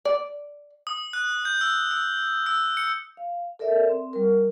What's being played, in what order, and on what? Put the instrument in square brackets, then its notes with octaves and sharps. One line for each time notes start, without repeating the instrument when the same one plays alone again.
[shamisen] D5
[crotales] D#6
F#6
G6
E6
E6
E6
C#7
[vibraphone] F5
A4 A#4 D5 E5
C4
G3 A#4